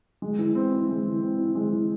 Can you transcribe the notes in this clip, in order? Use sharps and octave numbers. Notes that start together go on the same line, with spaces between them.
G#3
E3
C4
E4
G#3
E3
C4
E4
G#3
E3